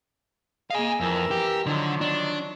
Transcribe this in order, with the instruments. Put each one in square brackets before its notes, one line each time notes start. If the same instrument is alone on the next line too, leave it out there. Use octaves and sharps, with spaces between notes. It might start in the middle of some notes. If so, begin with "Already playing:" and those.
[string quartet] A#3 G#4 D#5 [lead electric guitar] F5 G#5
[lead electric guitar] F2 [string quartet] E3 A#4 E6
[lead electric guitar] G4
[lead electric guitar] D3 [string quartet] D#3 F3 F#3
[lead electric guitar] D4